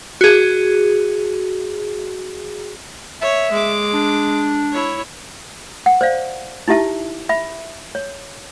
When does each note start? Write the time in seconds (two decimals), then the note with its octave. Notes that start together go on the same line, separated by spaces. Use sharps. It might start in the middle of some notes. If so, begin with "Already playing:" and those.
0.21 F#4 G#4
3.22 C#5 E5
3.52 G#3 D6
3.94 D4
4.72 E4 C#5
5.86 F#5
6.01 C5 D5 F5
6.68 D#4 E4 G4 E5 A5
7.29 E5 B5
7.95 C#5